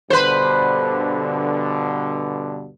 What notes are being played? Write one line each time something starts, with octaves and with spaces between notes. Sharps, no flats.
G2 B2 D3 B4 C5